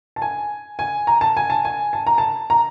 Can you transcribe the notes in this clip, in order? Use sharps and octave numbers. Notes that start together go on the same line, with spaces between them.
A5
G#5
G#5
A#5
A5
G#5
A5
G#5
A5
A#5
A5
A#5